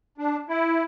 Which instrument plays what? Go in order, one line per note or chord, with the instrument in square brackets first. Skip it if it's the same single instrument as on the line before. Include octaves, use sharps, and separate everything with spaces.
[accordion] D4
E4